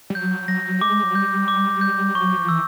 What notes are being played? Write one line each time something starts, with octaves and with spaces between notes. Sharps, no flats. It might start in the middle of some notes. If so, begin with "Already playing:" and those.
G3
F#3 G6
F#3 A#6
G#3 D6
F#3
G3 G6
D6
G6
F#3 C#6
F3
E3 E6